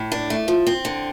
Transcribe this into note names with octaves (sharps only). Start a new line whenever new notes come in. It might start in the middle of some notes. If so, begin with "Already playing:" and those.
Already playing: A2
D4
A3
F3
C4
D3